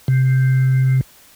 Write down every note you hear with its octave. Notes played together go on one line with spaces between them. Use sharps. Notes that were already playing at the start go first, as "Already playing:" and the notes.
C3